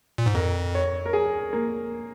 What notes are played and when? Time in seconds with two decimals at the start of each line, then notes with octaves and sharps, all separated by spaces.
0.18 A#2
0.26 G#2
0.35 F2 A#4
0.75 C#5
1.06 A#4
1.13 G#4
1.53 A#3